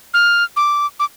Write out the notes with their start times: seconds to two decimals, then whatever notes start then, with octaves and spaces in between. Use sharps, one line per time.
0.14 F6
0.56 D6
1.00 D6